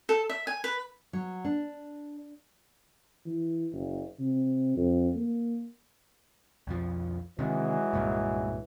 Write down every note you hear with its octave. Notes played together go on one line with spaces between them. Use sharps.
A4
E5
G#5
B4
F#3
D4
E3
F#1
C3
F2
A#3
B1 F2 F3
C3 D#3 E3 F#3 G#3
C2 G2 A#2